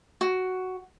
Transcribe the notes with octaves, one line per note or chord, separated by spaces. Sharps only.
F#4